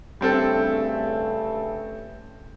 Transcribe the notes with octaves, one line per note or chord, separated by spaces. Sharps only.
G2 C#3 G3 A3 C4 A4